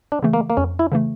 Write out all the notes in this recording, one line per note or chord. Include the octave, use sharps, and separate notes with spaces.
D4
C#3 E3 A3
A#3
A#3
F2 C#4
E4
C#3 E3 A3